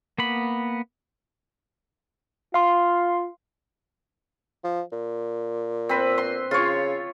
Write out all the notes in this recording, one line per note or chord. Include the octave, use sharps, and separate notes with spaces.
A#3 B3 B5
F4 F5 C6
F3
A#2
C4 B4
C6
C#3 F4 C#5